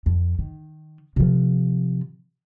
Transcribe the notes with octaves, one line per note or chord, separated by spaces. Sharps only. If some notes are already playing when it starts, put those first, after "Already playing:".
F2
D#3
C3 F3